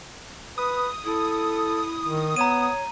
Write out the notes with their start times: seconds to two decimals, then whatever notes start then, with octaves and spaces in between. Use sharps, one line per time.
0.58 B4 D#6
1.04 E4 A4
2.05 D#3
2.36 B3 C#5 A#5 D#7